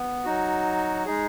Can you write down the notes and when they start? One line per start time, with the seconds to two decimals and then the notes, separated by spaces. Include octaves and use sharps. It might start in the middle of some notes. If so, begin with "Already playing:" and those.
Already playing: B3
0.25 F#3 D#4 F#4
1.06 G#3 D#4 G#4